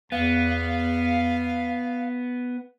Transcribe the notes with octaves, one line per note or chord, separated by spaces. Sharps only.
E2 B3 F5